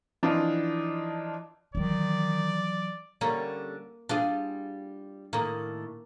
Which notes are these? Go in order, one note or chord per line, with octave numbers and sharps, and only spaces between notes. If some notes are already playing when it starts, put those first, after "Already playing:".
E3 F3 D4 D#4 F4
D#3 E3 F#3 D5
D3 G3 A#3 C#4
G3 D4 F4 G#4
A2 D#3 A#3